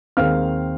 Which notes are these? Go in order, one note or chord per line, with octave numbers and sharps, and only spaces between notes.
D#2 D#3 G#3 C4 F5 F6